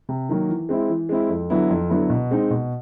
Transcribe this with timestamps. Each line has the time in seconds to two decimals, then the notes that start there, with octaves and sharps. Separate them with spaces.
0.09 C3
0.29 D#3 F#3 A#3
0.49 E3
0.69 G#3 C4 E4
0.89 E3
1.09 G#3 C4 E4
1.29 F2
1.50 D3 F#3 B3 E4
1.70 F2
1.89 D3 F#3 B3 E4
2.10 B2
2.31 G#3 C4 D#4
2.50 B2